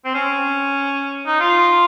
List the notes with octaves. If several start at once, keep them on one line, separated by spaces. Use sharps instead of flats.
C4
C#4
D#4
F4